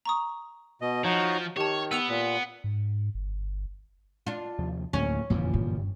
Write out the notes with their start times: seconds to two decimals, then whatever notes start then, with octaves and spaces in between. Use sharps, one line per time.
0.05 A#5 C#6 D#6
0.81 B2 D#5
1.04 F3 D#4 F#4 C#5
1.56 D#3 G4 C#5 A5
1.91 B3 E6 C#7 F7
2.09 A#2 B3
2.64 G#2
3.15 G1
4.27 D4 F4
4.59 D#2 C3 F3
4.93 D2 A2 F#3 A#3 C#4
5.30 F#1 F2 A#2 D3 E3 F3
5.54 G2